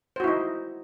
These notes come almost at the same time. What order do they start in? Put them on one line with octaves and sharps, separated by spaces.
C5 F#4 E4 D#4